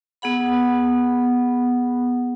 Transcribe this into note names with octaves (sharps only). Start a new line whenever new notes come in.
B3 G#4 F#5 B5